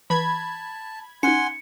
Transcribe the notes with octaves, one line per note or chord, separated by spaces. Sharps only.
E3 A5 B5 G#6
C#4 D#4 F#5 G#5 C6 C#7